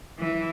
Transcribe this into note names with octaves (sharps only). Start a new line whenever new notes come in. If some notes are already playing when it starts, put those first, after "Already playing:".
E3